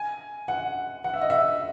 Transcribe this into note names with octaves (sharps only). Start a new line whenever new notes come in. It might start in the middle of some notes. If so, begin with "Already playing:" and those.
Already playing: G#5
F#5
F#5
E5
D#5
E5